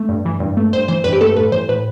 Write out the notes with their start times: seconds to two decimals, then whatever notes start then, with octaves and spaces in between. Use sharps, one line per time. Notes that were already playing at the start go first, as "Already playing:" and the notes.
Already playing: A3
0.09 G2
0.25 E3
0.40 G2
0.57 A3
0.73 G2 C5
0.88 E3 C5
1.04 G2 B4
1.13 G4
1.21 A3 A4
1.37 A2 B4
1.52 E3 C5
1.69 A2 B4